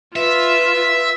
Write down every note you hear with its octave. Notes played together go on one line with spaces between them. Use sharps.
F4 B4 E5